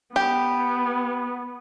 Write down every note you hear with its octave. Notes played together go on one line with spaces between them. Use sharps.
B3 G4